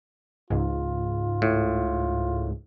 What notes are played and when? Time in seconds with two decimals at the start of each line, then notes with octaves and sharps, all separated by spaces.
0.50 C#2 G#2 F4
1.42 A2